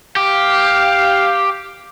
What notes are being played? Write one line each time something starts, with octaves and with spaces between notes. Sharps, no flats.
G4 F5